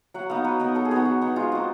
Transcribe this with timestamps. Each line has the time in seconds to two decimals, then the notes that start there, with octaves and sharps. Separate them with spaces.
0.14 F#3 F#5
0.30 B3 D#4 F5
0.44 F#3 B4
0.60 B3 D#4 A#4
0.75 F#3 A4
0.85 G#4
0.91 B3 D#4 F#4
1.05 F#3
1.21 B3 D#4
1.36 G#3 F4
1.52 C4 D#4 F#4